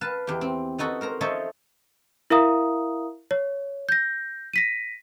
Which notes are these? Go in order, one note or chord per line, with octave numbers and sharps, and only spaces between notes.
B4 F5 A5
E2 G4
C4
B3 D#4 F#4 A4 B5
A#4 C5 A#5
F3 D#4 A4 C5 C#5 E5
E4 A#4 E5 F5 A#5 D#6
C#5
G6 A#6
A#6 B6 D#7